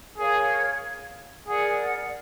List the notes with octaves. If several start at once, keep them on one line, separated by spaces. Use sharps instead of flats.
G#4 A#4 C#5 F5
G#4 A#4 D5 F#5